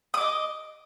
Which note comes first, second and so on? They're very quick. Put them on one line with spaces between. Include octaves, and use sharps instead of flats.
D#6 D6 D#5